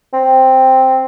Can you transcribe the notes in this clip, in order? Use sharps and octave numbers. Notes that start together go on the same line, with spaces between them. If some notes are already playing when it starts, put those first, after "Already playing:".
C4